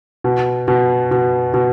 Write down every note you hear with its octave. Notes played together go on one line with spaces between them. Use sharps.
B2
B2
B2
B2